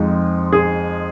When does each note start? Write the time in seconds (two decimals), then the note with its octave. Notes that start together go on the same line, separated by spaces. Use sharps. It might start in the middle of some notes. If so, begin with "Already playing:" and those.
Already playing: F2 F3 G#3 D#4
0.53 G#4